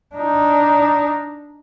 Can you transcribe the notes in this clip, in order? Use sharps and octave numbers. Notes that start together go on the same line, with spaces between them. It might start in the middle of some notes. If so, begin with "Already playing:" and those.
D4 D#4